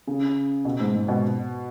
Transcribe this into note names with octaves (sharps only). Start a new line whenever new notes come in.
C#3
B2
G#2
G#2
B2